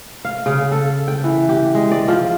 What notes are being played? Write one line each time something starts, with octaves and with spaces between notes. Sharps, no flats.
F5
C#3
A4
G5
E3
G4
G#3
D5
F3